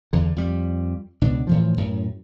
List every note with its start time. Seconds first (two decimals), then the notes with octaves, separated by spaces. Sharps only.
0.13 E2 D3
0.36 F2 G3
1.21 C#2 B2 D4
1.47 A2 E3 F3
1.77 F#2 A2